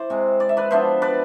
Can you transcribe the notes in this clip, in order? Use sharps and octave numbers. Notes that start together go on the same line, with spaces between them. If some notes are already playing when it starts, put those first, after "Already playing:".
Already playing: E4 C5 D5
C3 G#3 C4
D5
E5
B4 D5
F3 B3 D4 C5 E5
B4 D5